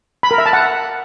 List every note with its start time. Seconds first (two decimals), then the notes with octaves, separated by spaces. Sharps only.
0.23 B5
0.31 A#4
0.38 E5
0.46 A5
0.53 F#5